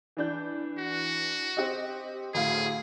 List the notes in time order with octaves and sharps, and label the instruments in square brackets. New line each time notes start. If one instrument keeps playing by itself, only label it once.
[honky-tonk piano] E3 D4 G6
[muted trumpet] F#4
[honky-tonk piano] C4 G4 D#5
[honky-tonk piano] D2 A2 F5 [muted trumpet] G#4